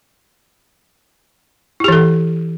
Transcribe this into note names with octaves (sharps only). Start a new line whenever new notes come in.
E3 E4 G4 A4